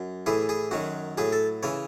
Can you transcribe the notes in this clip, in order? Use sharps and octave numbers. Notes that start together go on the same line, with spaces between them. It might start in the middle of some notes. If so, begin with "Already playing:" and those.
Already playing: F#2
A2 E3 G#4
G#4
F#2 D#3 F#3 F#4
A2 F#3 G#4
A4
C#3 E3 C#5